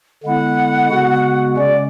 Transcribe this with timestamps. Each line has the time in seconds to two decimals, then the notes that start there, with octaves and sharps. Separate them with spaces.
0.23 D3 G#3 B3 E4 F#5
0.90 C#3 G#3 B3 F#4
1.56 C#3 G#3 C#4 D5